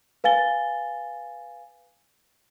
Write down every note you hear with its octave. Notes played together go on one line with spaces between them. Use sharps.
B4 F5 G#5 A6 G7